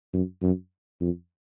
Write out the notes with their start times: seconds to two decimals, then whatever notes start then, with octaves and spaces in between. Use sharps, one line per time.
0.14 F#2
0.42 F#2
1.01 F2